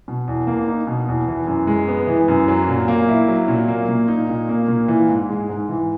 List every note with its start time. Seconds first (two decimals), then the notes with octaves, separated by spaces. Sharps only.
0.08 B2
0.28 E2
0.47 A#3
0.68 D#4
0.87 B2
1.08 E2
1.28 E3
1.47 F#2
1.67 G#3
1.88 B3
2.07 E3
2.28 F#2
2.48 F#3
2.68 A#2
2.88 A#3
3.09 E4
3.28 F#3
3.48 A#2
3.68 A#3
3.89 A#2
4.08 D#4
4.29 A#2
4.49 A#3
4.68 A#2
4.88 E3
5.09 G#2
5.29 G#3
5.49 G#2
5.69 E3